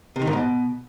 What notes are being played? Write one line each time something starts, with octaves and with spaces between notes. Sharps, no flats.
C3
D#3
G#2
B2